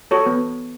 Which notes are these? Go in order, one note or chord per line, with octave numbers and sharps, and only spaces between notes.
F#4 A4 C#5
B3